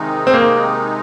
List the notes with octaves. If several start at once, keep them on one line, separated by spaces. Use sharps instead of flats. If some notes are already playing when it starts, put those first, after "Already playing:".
Already playing: C3 D#3 G#3 D#4
C4
A#3